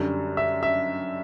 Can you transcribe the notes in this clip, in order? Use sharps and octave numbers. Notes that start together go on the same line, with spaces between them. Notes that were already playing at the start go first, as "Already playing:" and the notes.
Already playing: F#2 D3 G3
E5
E5